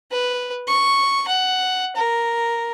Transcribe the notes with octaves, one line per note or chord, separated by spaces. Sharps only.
B4
C#6
F#5
A#4